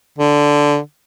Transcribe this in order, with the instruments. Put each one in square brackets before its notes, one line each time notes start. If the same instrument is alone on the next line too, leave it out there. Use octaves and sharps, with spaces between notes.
[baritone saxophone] D3